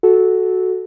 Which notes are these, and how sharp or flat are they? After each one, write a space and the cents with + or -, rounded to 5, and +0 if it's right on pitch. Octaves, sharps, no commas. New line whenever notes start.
F#4 +0 A4 -15